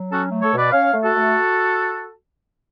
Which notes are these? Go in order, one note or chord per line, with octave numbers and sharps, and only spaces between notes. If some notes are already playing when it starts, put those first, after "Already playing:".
Already playing: F#3
C#4 F#4 A4
A3
A4 C#5
B2 B4 D5
C#4 C#5 F5
A3
F#4 A4
A3